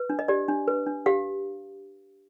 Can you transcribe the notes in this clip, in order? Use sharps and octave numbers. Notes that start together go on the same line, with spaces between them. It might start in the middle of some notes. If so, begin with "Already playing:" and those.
Already playing: B4
D4
D#5
G4 D5
D4
B4
D4
G4 F5